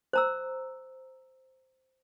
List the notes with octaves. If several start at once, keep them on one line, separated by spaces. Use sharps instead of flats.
C5 A#5 E6